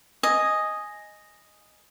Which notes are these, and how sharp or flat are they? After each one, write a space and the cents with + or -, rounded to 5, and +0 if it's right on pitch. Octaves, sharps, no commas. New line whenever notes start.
D#5 +0 G#5 +0 D#6 +0